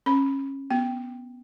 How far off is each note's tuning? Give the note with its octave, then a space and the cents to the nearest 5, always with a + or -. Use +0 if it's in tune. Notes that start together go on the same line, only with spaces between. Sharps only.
C#4 -20 B5 -5
B3 +0 G5 +0